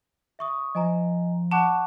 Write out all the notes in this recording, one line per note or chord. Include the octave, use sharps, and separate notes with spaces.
E5 C#6 D#6
F3 D#5 G#5 A#5
F#5 A5 C#6 D6 F#6